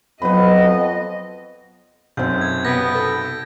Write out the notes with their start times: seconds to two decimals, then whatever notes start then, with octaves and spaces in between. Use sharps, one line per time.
0.22 F2 F#3 B3 B4 D#5 B5
2.17 B1 F#2 C4 G6
2.41 G#6
2.65 C3 B3 A#6 D7
2.95 A4